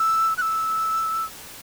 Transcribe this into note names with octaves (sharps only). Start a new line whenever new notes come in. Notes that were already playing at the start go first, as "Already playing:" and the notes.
Already playing: E6
F#6
E6